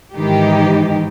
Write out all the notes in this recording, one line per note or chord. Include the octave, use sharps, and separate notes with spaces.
G#2 D#3 E3 D#4 G4